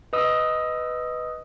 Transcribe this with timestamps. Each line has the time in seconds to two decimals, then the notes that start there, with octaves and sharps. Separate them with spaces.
0.13 B4 D#5 D#6 E6